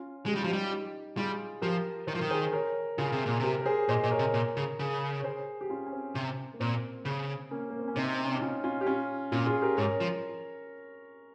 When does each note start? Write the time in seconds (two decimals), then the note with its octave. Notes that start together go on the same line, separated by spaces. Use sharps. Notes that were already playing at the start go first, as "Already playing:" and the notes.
Already playing: C#4 F4
0.26 G#3 G4
0.35 G3 F4
0.44 F3 D#4 G4
0.53 G3
0.66 F4
0.71 D#4 G4
1.17 G3 F4 G#4
1.62 F3 G4 A#4
2.07 D#3 C5
2.15 F3
2.19 D#3 A#4
2.30 G#4 C5
2.53 A#4 C#5
2.98 C#3 F4 G#4
3.12 C3
3.26 A#2
3.40 C3 G4 A#4
3.61 A#4
3.66 G#4 C5
3.89 A#2 C5 D#5
4.03 A#2 D#5
4.11 A#4 C#5
4.19 C3
4.34 A#2
4.57 C#3
4.79 C#3
5.20 C#5
5.24 G#4 C5
5.61 G4
5.70 C#4 F4
5.86 C#4
5.92 C4
6.15 C3
6.54 A#3
6.60 A#2 C4
7.05 C#3
7.51 A#3 C#4
7.70 A#3
7.79 C4
7.88 C#4
7.96 C3 C4 D#4
8.24 C#4
8.33 D#4
8.42 C#4 F4
8.64 C#4 F4
8.81 G4
8.86 C#4 F4
9.32 A#2 C#4 F4
9.47 F4 G#4
9.62 G4 A#4
9.77 G#2 A#4 C#5
10.00 F3